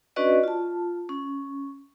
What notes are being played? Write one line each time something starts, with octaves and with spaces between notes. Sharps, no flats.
C#4 D4 F#4 B4 D5 D#5
F4 A5
C#4